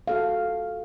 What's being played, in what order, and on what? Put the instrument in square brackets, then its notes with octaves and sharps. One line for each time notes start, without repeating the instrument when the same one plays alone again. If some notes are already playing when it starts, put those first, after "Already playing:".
[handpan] F#4 A4 F5